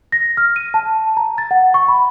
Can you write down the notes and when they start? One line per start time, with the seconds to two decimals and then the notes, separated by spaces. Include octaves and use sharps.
0.12 A#6
0.37 F6
0.56 D#7
0.74 A5
1.17 A#5
1.38 A6
1.51 F#5
1.74 C#6
1.88 B5